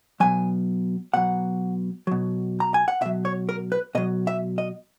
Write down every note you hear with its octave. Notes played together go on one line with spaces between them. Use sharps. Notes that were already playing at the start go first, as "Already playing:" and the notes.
B2 F#3 G#5
B2 F#3 F#5
B2 F#3
A#5
G#5
F#5
B2 F#3 E5
C#5
A#4
B4
B2 F#3 D#5
E5
D#5